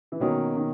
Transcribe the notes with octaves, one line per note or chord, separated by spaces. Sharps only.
E3
B2 D#3 F#3 A#3 C#4
D#3